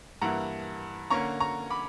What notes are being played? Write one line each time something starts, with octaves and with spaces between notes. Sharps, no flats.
G2 E3 A#3 E4 F#5 A#5
D3 A#3 C#4 A#5 C#6
A#5 C#6
B5 D6